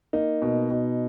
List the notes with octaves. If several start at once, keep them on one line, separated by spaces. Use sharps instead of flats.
A#3 D#4
B2
B2